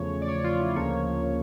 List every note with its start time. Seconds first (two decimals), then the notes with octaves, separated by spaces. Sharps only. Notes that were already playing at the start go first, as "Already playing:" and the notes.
Already playing: E2 C#3 F3 A3 C#5
0.22 D5
0.28 C#5
0.44 F4
0.60 E4
0.76 D2 C#3 F3 A#3 C#5